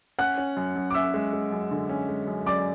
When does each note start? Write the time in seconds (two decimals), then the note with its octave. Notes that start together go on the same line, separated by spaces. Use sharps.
0.19 C#4 F#5 F#6
0.38 C#4
0.57 F#2
0.76 F#2
0.91 D6
0.94 C#4 E5 E6
1.14 G#3
1.33 G#3
1.52 F#2
1.71 D3
1.89 C#4
2.09 G#3
2.27 F#2
2.46 F#2 D5 D6